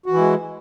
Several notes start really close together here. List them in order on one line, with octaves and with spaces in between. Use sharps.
F#4 E3 E4 G#3